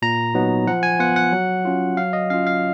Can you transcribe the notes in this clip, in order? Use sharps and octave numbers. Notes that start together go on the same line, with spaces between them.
A#2 A#5
F#3 B3 D#4
F3 F#5
G#5
B3 F4 F#5
F#5
F#3
C#4 F4
F#3 F5
D#5
C#4 F4 F5
F5